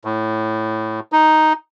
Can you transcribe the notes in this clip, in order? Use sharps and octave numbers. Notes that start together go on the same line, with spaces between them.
A2
D#4